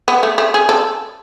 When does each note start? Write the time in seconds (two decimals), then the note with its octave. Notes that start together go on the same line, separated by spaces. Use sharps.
0.08 B3
0.23 A3
0.38 A3
0.54 G#4
0.69 A4